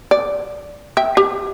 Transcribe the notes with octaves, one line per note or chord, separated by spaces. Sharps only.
D5
E5 G5
G4